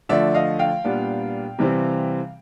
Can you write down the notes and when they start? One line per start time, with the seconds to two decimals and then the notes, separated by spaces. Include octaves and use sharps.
0.09 D3 F3 A3 D5 E5
0.34 D#5 F5
0.59 F5 G5
0.84 A#2 G3 B3 D4
1.59 C3 E3 G3 C4